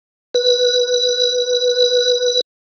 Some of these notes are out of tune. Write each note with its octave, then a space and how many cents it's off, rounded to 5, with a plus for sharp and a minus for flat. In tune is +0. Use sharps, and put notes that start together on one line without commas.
B4 -5